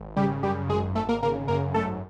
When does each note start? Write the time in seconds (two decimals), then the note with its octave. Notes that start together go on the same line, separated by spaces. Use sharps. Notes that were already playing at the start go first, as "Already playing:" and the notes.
Already playing: G#1
0.16 C#3 G3 G4
0.43 F#2 G3 G4
0.69 G#1 G#3 G#4
0.95 G#1 A3 A4
1.09 A#3 A#4
1.23 C#3 A#3 A#4
1.48 F#2 A#3 A#4
1.74 G#1 A3 A4